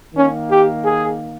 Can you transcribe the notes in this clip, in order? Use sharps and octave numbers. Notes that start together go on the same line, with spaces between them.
D#3 A#3 C#4
G4
G#4